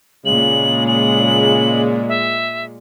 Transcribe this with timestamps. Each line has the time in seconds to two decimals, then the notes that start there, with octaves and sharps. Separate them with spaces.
0.26 A#2 C#3 G#3 F#7
0.87 F#7
2.08 E5